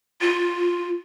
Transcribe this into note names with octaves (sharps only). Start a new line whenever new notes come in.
F4